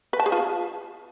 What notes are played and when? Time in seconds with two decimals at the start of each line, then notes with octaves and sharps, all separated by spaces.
0.13 B4
0.20 A5
0.26 G#4
0.32 F4